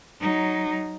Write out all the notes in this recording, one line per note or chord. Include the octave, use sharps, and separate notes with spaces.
F#3 D#4